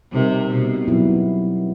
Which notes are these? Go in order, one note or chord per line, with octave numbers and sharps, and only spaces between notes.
C3 G3 C4 D#4 G4 A#4
B2
B2 F#3 B3 E4